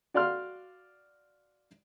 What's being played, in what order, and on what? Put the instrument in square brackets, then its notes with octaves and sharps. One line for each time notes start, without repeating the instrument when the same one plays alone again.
[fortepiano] F#4 D5 F5 C6 F6